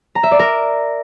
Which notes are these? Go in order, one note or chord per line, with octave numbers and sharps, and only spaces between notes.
A#5
E5
D5
A#4